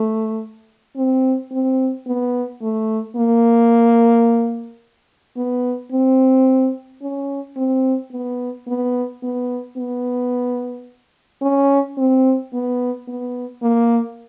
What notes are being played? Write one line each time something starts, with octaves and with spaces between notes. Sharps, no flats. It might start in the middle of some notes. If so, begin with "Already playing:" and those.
Already playing: A3
C4
C4
B3
A3
A#3
B3
C4
C#4
C4
B3
B3
B3
B3
C#4
C4
B3
B3
A#3